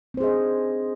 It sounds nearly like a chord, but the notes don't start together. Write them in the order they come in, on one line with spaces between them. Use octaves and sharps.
C4 C5 G#4 D#5 D4